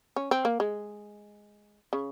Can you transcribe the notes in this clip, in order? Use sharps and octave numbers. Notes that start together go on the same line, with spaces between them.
C#4
C4
A#3
G#3
C#3